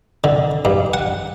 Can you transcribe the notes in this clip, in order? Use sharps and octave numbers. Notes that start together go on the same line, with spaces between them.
D3
G2
F#5